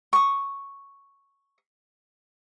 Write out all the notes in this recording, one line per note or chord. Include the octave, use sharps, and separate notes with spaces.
C#6 D#6